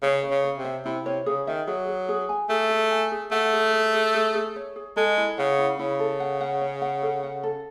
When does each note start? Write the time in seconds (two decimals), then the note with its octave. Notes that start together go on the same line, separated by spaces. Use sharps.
0.02 C#3 C#5
0.23 C#5
0.31 C#3
0.44 C#5
0.58 C3
0.65 E5
0.85 C3 E4
1.06 C3 C#5
1.26 C#3 G#4
1.47 D#3 E5
1.67 F#3 G#4
1.88 G#4
2.09 G#4
2.29 G#5
2.49 A3 G#4
2.71 G#4
2.91 G#5
3.12 G#4
3.32 A3 F#5
3.53 G#4
3.73 G#4
3.94 G#4
4.15 G#4
4.35 G#4
4.56 C#5
4.76 G#4
4.96 G#3 A4
5.18 E4
5.38 C#3 F#5
5.59 E4
5.79 C#3 E4
5.99 A4
6.20 F#5
6.41 F#5
6.61 C#5
6.82 F#5
7.02 A4
7.23 F#5
7.43 A4